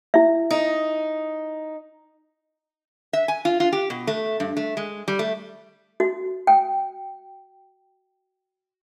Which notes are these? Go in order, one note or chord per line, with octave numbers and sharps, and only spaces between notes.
E4 E5
D#4
E5
G#5
F4
F4
G4
B2
A3
G2
A3
G#3
G3
A3
F#4
G5